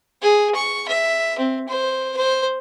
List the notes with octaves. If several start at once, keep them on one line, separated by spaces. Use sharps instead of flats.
G#4
C#6
E5
C4
C5
C5